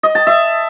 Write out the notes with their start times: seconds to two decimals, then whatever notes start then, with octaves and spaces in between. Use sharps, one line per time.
0.03 D#5
0.15 A5
0.27 E5